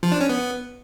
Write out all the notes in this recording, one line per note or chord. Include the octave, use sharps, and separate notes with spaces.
F3
D4
C#4
B3